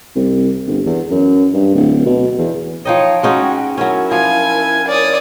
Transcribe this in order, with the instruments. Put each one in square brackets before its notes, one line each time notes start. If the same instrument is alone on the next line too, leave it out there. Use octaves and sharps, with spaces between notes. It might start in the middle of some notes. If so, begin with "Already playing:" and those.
[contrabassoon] C2
G1
E2
F#2
G2
D1
B2
E2
[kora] F3 D#4 D#5 [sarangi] C#5 [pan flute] G5
[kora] G#3 C#4 D#4 [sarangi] F#4
[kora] F#3 C#4 [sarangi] E4 [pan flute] A#4
[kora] F3 [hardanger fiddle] G#5
[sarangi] C#5 [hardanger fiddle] D5 D#6